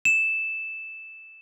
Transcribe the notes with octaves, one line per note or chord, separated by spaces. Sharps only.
E7